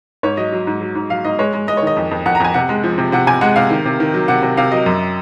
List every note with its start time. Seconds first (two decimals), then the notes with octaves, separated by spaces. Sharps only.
0.23 G#2 C#5
0.37 F#3 D#5
0.52 F#3
0.67 G#2
0.81 F#3
0.95 G#2
1.10 F#3 F5
1.25 G#2 D#5
1.39 G#3 C#5
1.53 G#3
1.67 G#3 D#5
1.77 C#5
1.82 D#3 D#5
1.96 F2
2.11 F2
2.26 F2 F#5
2.35 A#5
2.40 F2 G#5
2.54 C3 F#5
2.69 G#3
2.83 F3
2.98 C3
3.12 C3 F#5
3.27 C3 G#5
3.41 G#3 F#5
3.56 C3 F5
3.71 D#3
3.85 C3
4.00 D#3
4.14 F#3
4.28 C3 F#5
4.42 C3
4.57 C3 F5
4.72 F#3 D#5
4.86 F#2